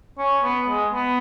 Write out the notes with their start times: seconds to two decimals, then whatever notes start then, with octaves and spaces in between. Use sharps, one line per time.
0.18 C#4
0.43 B3
0.67 G#3
0.93 B3